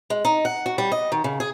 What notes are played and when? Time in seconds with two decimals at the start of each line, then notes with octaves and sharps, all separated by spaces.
0.10 G#3
0.25 D#4
0.45 F#5
0.66 F#4
0.78 G3
0.92 D#5
1.12 D#3
1.24 C#3
1.40 G#4